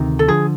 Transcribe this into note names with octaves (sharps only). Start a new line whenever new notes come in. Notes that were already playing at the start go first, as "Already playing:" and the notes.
Already playing: D2 C3 D#3
A4
D3 F3 G#4